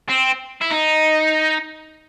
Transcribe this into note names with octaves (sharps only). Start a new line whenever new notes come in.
C4
E4
D#4